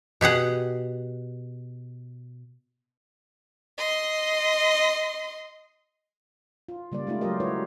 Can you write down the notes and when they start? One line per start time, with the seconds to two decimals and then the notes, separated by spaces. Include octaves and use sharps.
0.21 B2 G4 G#4 F#5
3.78 D#5 C6
6.69 F4
6.92 C#3 G3 A#3 D5
7.07 G#3 A3 D#4 F4
7.21 F#3 A3 F4 G4 A#4 D#5
7.40 E4 F#4 B4 C#5